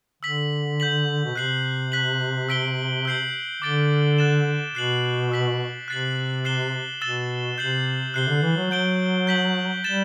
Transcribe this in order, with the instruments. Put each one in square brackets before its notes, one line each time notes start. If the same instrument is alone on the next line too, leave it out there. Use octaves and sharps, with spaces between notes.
[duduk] D3 [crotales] E6 B6 F#7
[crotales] G6 B6 F#7
[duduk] B2
[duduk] C3 [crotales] F#6 C7 F#7
[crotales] F#6 B6 F#7
E6 B6 D7 G7
E6 G6 C7 F#7
[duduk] D3 [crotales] D6 A6 D7 G7
[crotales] F#6 A6 E7
[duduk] B2 [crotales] F#6 C7 F#7
[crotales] E6 B6 F#7
[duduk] C3 [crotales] F#6 A6 C7 F#7
[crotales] F#6 C7 E7 G7
[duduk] B2 [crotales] E6 A6 E7 G7
[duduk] C3 [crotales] G6 C7 F#7
[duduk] C3 [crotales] F#6 C7 G7
[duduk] D3
E3
F#3
[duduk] F#3 [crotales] G6 D7 G7
[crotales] G6 B6 F#7
[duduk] G3 [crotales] A6 E7 G7